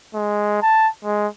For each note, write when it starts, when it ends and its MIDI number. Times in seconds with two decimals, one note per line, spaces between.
0.15 0.61 56
0.62 0.88 81
1.04 1.27 56